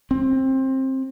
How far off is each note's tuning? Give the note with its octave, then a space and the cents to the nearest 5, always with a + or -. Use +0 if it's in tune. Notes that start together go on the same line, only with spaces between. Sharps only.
C4 +20